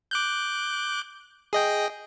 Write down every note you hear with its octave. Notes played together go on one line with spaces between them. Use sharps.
D6 F#6 G6
G#4 D#5 G5